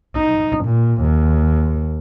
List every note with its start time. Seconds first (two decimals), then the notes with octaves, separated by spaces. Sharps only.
0.16 D#4
0.65 A#2
1.02 D#2